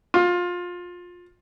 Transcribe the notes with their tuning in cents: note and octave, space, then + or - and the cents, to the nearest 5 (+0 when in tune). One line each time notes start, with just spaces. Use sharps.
F4 +20